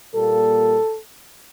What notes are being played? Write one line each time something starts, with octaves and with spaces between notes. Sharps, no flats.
A#2 G3 A#3 A4